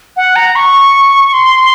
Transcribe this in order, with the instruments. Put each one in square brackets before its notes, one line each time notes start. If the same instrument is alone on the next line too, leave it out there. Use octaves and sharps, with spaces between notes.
[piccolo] F#5
A#5
C#6
C6